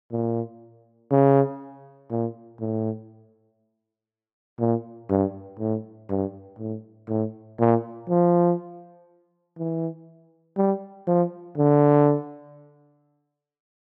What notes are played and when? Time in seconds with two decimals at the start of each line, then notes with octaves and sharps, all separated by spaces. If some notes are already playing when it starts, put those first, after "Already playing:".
0.11 A#2
1.11 C#3
2.11 A#2
2.60 A2
4.59 A#2
5.09 G2
5.59 A2
6.09 G2
6.58 A2
7.08 A2
7.59 A#2
8.09 F3
9.59 E3
10.57 G3
11.07 F3
11.57 D3